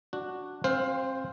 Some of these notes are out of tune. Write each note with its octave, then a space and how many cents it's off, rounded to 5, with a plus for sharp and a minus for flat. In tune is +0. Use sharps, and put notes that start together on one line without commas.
D4 +0 F#4 +0
C4 +35 C5 +0 F5 +15